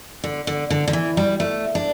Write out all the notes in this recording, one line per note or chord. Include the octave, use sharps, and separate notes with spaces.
D3
D3
D3
D3
E3
G3
A3
D4